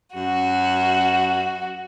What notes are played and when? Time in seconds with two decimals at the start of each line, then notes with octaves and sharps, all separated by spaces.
0.15 F#2 F#4